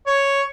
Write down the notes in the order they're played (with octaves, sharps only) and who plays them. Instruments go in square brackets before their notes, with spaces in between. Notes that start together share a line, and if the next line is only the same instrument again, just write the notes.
[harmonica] C#5